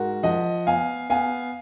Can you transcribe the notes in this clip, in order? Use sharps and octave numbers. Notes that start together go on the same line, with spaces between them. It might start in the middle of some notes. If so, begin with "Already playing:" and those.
Already playing: G#2 F#4 A#4
F3 D#5 F#5
B3 F5 G#5
B3 F5 G#5